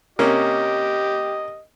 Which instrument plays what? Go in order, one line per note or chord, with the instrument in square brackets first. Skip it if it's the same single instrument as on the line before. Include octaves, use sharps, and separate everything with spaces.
[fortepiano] C3 A#3 C#4 [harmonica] G4 D#5